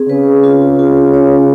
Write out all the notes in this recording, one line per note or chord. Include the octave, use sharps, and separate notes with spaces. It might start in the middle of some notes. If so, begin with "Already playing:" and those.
Already playing: C4 G#4
C#3 B4
F4
F4
C#5